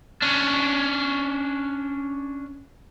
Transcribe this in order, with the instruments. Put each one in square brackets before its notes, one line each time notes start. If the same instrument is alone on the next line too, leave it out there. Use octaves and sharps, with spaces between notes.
[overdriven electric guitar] C#4 D4